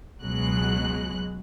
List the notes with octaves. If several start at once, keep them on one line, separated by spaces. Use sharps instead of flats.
C#2 B2 F#3 G#3 F#6